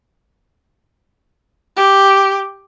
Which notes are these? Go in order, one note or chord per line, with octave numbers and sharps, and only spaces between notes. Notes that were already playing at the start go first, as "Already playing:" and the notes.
G4